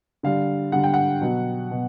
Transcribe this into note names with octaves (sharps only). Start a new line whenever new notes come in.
D3 G3 F5
D3 G3 F#5
G5
F#5
B2 F#3
B2